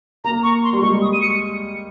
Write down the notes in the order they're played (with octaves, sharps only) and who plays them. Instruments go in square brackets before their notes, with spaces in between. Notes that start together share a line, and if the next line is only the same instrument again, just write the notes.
[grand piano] A#3 [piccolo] A#5
[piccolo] C#6
C6
[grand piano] G3
[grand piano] G#3 [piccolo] C#6
[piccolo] D#6
D#7
C#7